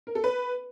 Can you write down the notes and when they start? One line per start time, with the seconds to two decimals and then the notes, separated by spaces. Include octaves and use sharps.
0.07 A#4
0.15 A4
0.24 B4